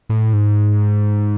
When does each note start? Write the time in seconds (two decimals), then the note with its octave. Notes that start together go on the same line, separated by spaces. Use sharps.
0.09 A2
0.33 G#2